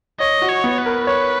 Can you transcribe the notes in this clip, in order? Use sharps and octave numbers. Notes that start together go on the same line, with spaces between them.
C#5 D#5
F#4
C#5
B3
B4
A#4
B4 C#5